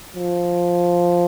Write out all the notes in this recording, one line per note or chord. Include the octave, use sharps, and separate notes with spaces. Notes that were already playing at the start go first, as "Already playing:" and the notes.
F3